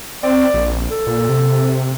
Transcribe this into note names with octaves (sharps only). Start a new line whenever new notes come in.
C4 D5
A#1
A4
A#2
C3